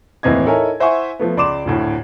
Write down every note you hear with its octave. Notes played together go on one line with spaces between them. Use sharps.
D#2 A2 E3 C4 D#5 G#6
D#4 E4 A4 A#4 C#5 G#5
E4 C5 E5 F#5 G#5 C#6
F3 A3 B3
C#2 D5 C6 D6 E7
G#1 D2 A2